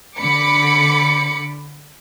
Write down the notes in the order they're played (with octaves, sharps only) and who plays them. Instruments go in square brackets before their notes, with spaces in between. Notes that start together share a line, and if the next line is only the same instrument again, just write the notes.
[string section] D3 B5 D6 C#7